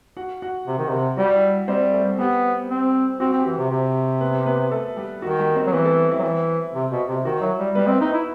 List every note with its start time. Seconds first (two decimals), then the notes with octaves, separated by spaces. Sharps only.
0.17 F#4 F#5
0.42 F#4 F#5
0.67 C3
0.78 D#3
0.89 C3
1.17 G3 F#4 F#5
1.35 E4 E5
1.68 G3 C4 C5
1.93 A3 A4
2.19 G3 B3 G4
2.70 C4
3.20 C4 F#4
3.33 C4
3.39 G4
3.46 E3 F#4
3.58 C3
3.71 C3
4.21 B3 B4
4.46 B3 B4
4.71 A3 A4
4.97 G3 G4
5.22 D#3 F#4
5.39 G3 G4
5.56 C4 C5
5.67 F#3
5.73 E3 B3 B4
5.85 A3 A4
6.11 E4
6.19 F#3
6.23 E3
6.75 C3
6.91 B2
7.08 C3
7.25 D#3 F#4
7.41 F#3 E4
7.58 G3
7.75 G3 B3 B4
7.88 C4
8.00 B3 D#4 B4
8.13 E4